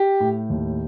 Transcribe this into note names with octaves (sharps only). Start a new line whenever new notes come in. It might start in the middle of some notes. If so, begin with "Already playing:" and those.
Already playing: G4
A2
D#2